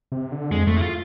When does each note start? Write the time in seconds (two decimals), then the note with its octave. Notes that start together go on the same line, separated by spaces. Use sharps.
0.12 C3
0.32 D3
0.51 F2 G#3
0.67 F2 A3
0.77 E4
0.82 F4